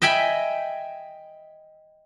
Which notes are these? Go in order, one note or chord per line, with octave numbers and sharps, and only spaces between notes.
D#5 E5 G5 G#5 B5